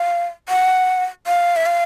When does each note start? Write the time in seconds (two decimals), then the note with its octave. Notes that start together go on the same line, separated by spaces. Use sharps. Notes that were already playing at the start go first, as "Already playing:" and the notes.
Already playing: F5
0.49 F#5
1.27 F5
1.56 E5
1.66 F5